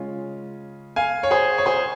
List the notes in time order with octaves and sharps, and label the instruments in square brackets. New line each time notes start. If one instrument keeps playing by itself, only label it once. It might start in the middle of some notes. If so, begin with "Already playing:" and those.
Already playing: [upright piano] C#3 G#3 C#4 F4
F5 G#5
C#5
G#4 C5
C#5
G#4 C5